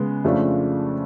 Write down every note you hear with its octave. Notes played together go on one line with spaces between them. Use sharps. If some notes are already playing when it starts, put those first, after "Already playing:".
Already playing: C#3 G#3 B3
F2 C#3 F3 A3 D4